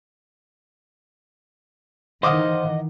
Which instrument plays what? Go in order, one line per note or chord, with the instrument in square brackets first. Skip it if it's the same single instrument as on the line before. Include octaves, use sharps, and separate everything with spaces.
[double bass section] D#3 E3 [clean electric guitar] C5 F5 [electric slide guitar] D#5 [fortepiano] F#5 D6 D#6